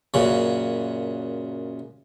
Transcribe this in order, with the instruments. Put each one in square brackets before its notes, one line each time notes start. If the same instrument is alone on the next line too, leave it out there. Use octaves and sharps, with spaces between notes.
[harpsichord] F#2 A#2 C#3